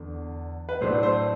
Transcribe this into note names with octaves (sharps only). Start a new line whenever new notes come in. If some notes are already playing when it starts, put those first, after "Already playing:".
Already playing: E2 D3
B4
A2 F#3 A3 D4 C5
C5